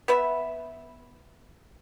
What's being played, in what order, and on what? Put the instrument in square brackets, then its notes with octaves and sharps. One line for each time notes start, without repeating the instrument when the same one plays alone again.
[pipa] B3 B4 E5